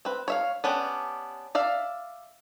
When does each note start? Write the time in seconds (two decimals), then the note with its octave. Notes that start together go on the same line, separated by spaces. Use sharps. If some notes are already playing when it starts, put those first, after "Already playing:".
0.05 C4 B4
0.28 C#5 E5 F5
0.64 B3 C#4 D4 G4
1.55 D5 E5 F5